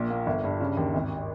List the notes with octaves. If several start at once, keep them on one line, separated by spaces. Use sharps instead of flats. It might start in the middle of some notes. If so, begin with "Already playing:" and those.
Already playing: A#1 A#2
A#3
G1
G2
C#3
D#2
G#1